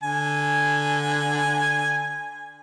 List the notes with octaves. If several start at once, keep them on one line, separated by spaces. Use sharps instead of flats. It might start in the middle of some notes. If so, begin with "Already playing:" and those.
D3 G#5